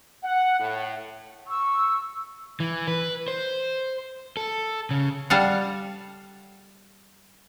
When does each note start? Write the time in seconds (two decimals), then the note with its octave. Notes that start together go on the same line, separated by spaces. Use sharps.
0.24 F#5
0.60 A2
1.47 C#6 E6
2.60 E3
2.88 B4
3.28 C5
4.37 A4
4.91 C#3
5.30 G3 A4 F5 F#5